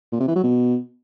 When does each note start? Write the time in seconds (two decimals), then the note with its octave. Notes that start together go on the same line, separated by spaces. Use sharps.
0.12 A#2
0.20 C3
0.28 E3
0.36 F#3
0.44 B2